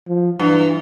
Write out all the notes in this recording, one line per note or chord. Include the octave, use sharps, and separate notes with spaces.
F3
G2 E3